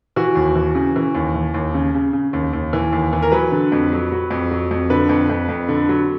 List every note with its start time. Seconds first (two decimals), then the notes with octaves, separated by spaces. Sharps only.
0.16 E3 F#4
0.35 D#2
0.56 E3
0.75 C#3
0.96 E3
1.15 D#2
1.34 E3
1.54 D#2
1.74 C#3
1.94 C#3
2.13 C#3
2.33 D#2
2.53 D#2
2.73 E3
2.93 D#2
3.13 E3
3.22 A#4
3.32 F#3 B4
3.52 D3
3.72 F2
3.92 F#3
4.12 F#3
4.31 F2
4.51 F#3
4.71 F2
4.90 D3 B4
5.09 F2
5.30 F2
5.49 F2
5.68 D3
5.89 F#3